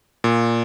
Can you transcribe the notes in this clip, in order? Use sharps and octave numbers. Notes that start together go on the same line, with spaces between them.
A#2